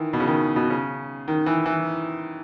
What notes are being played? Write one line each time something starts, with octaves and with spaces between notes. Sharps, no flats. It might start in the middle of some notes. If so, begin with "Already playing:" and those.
Already playing: D#3 E3
B2
C#3
D#3
B2
C#3
D#3
E3
E3